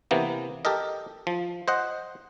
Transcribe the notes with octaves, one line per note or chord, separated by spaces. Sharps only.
C3 E3 A#3 B3
G4 A4 A#4 D#5
F3
C5 D#5 F#5